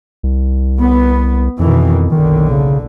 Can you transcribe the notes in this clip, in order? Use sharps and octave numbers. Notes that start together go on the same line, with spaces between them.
C2
B3
F2 B2 D#3 E3
F#1 B1 D3 D#3
C#3